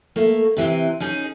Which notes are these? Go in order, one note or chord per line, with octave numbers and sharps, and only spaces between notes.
A3 A#3
C3 E3 C4
C#4 D#4 G#4